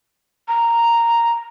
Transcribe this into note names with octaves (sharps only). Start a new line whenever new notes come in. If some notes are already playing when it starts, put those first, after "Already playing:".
A#5